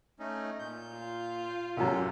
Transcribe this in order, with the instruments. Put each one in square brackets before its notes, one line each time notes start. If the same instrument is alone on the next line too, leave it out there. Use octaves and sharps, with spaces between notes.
[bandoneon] A3 C#4 D#4
A#2 G6
[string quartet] F4
[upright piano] C2 F#2 [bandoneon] G4 A4